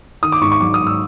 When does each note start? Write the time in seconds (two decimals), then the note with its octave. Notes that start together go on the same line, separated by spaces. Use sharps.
0.23 D#3 D#6
0.32 D6
0.41 G#2 C#6
0.52 C#6
0.61 F#3 D6
0.74 D#6
0.81 G#2
0.87 E6